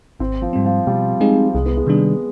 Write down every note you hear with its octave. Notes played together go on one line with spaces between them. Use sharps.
G#1 C4
F3
G#2 G3 C4
F3
B2 G3
G#3 C4 D#4 G#4
C2 G#3
B3
G#3
C3 D#3 G3 D4